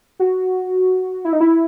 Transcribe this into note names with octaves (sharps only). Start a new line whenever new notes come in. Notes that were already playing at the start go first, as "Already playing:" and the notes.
F#4
E4
D#4
E4